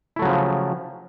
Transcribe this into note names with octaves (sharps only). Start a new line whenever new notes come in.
C#3 F3 F#3 A3 E4